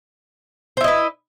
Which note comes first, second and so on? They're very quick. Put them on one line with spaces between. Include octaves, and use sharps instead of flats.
C5 E4 D#5 B4